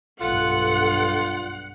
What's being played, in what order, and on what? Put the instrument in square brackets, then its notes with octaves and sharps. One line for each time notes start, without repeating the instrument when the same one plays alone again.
[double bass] B1 G2 [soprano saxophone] F4 [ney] A4 [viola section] F#5